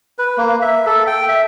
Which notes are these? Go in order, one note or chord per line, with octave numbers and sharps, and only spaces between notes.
B4
A#3
E5
A4
G5
E5